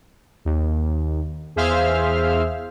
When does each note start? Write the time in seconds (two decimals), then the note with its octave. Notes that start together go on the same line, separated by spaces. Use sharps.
0.45 D#2
1.56 E2 G#4 C5 E5 F5 F6